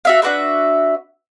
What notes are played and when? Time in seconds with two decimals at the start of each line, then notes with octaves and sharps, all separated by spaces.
0.05 F#4 E5 F5
0.22 D4 F#4 B4 E5